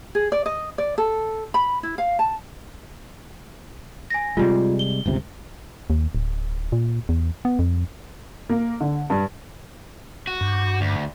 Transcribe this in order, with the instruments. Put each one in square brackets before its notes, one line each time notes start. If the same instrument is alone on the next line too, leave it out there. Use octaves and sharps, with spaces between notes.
[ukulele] G#4
D5
D#5
D5
A4
B5
E4
F5
A5
[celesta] G#5 A#6
[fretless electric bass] C3 G3 G#3 [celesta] F4
[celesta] G7
[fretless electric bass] G1 C#2 C3
[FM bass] D#2
D1
A#2
E2
B3
F2
[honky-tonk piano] A#3
D3
G2
[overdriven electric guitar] F#4
[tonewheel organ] G2
[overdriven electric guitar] D2